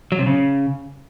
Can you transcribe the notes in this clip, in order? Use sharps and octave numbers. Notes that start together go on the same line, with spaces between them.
F#3
C3
C#3